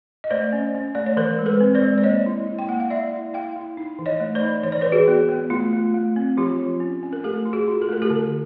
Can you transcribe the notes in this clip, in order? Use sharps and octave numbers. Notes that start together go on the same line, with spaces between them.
D#5
A3 C5 D5
C#4
C#4
A3 D5
C#5
E3 A#4 C5
G#3
A4 B4
C4
C5 D5
G#3
D5
A#3 C#5 D#5
E4
E4
G5
A#3 F#5
F5
E4 D5 E5
E4
E4 F5 G5
E4
D#4
E3
C#5 D#5
A3
C5 D5
D#4
E3 C#5
D5
E3 B4 C#5
F#4 G#4
B3
B3
A3 F4
A3
A3
C4
F3 F4 G4
F3
C#4
C#4
A#4
A3 G4 A4
F4
F#4 G#4
F4
A4
A3 A#4
G4 A4
D3